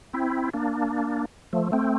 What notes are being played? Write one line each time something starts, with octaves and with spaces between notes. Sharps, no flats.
C4 E4
A#3 D4
F3 A3
A3 C4